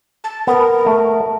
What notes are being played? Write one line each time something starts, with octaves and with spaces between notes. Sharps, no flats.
A5
B3 A#4
A3